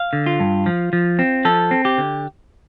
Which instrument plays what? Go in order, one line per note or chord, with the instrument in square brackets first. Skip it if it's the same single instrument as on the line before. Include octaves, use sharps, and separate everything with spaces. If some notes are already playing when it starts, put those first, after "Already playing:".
Already playing: [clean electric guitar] F5
D3
F4
G2
F3
F3
C4
F3 A4
C4
G4
D3